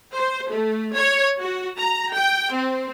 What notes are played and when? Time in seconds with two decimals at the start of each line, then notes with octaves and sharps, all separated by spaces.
0.15 C5
0.49 A3
0.93 C#5
1.42 F#4
1.79 A#5
2.14 G5
2.53 C4